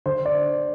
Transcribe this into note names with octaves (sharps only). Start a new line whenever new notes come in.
D3 C5
D5